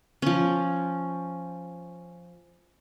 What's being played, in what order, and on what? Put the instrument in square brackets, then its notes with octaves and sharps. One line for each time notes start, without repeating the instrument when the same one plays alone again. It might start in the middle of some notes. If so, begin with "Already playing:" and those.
[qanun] F3 C#4